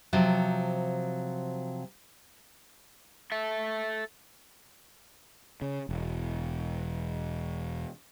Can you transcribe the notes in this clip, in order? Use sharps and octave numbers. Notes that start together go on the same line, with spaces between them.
C3 F3 F#3
A4 E5
C#3
E1